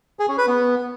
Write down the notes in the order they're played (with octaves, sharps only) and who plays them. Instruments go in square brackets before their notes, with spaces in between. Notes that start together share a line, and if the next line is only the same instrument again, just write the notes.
[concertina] G#4
C#4
B4
B3